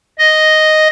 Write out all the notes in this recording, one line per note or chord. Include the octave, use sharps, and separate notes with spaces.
D#5